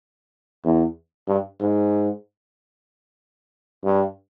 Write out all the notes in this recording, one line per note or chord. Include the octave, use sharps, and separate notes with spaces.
E2
G2
G#2
G2